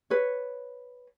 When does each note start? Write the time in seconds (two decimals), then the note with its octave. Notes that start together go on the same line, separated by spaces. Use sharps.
0.10 B4 C#5